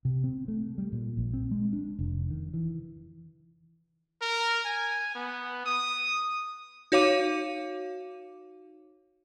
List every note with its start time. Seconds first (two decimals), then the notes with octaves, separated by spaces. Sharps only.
0.05 C3
0.24 C4
0.48 A3
0.78 G3
0.92 A#2
1.17 A#1
1.34 C4
1.51 G#3
1.73 D4
1.99 F1
2.30 D#3
2.54 E3
4.22 A#4
4.65 G#5
5.15 B3
5.66 D#6
6.92 D#4 F#4 C#5 F5 D6 D#7